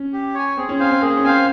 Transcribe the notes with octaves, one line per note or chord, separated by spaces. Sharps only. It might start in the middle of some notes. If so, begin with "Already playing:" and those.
Already playing: C#4
G4
C#5 G#5
C4 G#4
C#4
C4 C5 F5 G#5
C4
A#3 G#4
C#4
C4 C5 F5 G#5